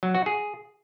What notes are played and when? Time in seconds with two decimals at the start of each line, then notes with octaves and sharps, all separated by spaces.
0.03 F#3
0.15 F#4
0.26 G#4